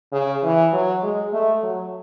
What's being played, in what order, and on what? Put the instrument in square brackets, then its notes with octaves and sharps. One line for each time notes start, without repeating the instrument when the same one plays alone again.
[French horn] C#3
E3
F#3
G#3
A3
F#3